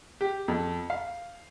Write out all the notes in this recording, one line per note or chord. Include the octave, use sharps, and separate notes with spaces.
G4
F2
F5